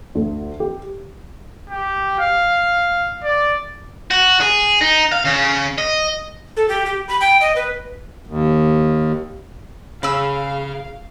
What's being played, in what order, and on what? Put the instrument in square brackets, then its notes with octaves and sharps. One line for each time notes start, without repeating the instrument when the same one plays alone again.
[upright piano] D2
G4
[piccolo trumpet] G4
F5
D5
[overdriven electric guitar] F#4
G#4
D#4
F5
C#3
D#5
[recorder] A4
G4
G4
B5
G5
D#5
B4
[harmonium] D#2
[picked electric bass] C#3 [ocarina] G#4 [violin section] F5 [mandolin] B5 E6